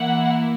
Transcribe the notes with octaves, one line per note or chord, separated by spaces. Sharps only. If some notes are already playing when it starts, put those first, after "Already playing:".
Already playing: E3 A#3 E4 F#5